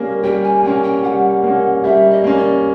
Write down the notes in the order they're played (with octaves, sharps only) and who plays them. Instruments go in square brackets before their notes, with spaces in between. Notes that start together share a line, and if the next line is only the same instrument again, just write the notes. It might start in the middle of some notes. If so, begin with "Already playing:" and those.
Already playing: [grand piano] G3 A#3 C#4
[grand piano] G3 [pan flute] G5
[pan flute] G#5
[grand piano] A#3 C#4 [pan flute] G5
[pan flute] G5
[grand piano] G3 [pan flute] F#5
[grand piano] A#3 C#4
[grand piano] G3 [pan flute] E5
[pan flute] D#5
[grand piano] A#3 C#4
[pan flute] D5